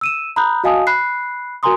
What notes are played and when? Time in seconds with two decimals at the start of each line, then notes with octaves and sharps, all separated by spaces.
0.01 E6 D#7 E7
0.36 A#5 B5 D#6 F#6 G6
0.64 F#4 D#5 F5 G#5 A5 D#6
0.87 B5 F#6 C7
1.63 F#4 A#4 G#5 A#5 C6 D#6